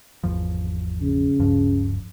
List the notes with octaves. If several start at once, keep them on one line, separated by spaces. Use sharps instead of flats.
G#1 E2 F3
C#3
D1 G2 F3